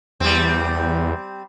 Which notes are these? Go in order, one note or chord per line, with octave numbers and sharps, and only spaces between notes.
E2 G3 C4